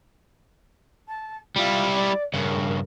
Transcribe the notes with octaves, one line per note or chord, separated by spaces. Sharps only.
A5
G3 E4 F4
D5
G2 C#3 A#4